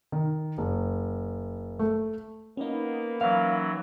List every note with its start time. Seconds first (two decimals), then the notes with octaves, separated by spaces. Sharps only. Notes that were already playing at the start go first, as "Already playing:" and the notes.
0.12 D#3
0.58 F#1
1.79 A3
2.57 A#3 B3 C#4 D#4
3.21 E3 F#3 F5